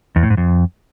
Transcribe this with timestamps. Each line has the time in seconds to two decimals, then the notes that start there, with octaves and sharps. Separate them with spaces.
0.16 E2
0.23 A2
0.30 G#2
0.37 F2